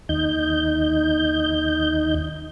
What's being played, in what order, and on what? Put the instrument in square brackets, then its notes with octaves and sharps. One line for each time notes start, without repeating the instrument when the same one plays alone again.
[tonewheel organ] D#2 D#4 G6